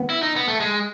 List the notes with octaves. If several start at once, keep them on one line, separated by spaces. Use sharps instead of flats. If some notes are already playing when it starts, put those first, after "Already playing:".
Already playing: B3
E4
D#4
B3
A3
G#3